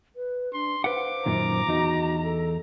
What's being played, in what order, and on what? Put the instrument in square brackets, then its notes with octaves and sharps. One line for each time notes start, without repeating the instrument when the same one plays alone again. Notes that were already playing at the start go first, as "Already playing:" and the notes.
[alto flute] B4
[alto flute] D4 [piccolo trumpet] C6
[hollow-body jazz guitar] B4 F5 F#5 [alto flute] C5 [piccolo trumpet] D6
[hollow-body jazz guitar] F#2 A#2 D#3 [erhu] A#5
[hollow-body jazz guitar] E2 D#4 [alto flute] F#4
[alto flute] A4